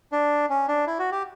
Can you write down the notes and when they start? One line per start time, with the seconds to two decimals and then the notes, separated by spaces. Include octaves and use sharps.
0.12 D4
0.49 C#4
0.68 D4
0.87 E4
0.99 F#4
1.12 G4